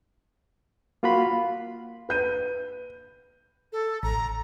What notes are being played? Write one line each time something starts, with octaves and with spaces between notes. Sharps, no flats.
A#3 F4 F#4 B5
B4 G6 D#7
A4
A1 A2 A#5 A#6